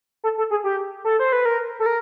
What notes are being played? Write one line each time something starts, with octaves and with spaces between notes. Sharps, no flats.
A4
A4
G#4
G4
A4
C5
B4
A#4
A4
A#4